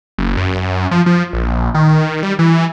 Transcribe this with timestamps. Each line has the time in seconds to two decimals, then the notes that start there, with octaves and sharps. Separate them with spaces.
0.18 F#1
0.37 F#2
0.91 F3
1.06 F3
1.33 A#1
1.75 D#3
2.23 G3
2.39 E3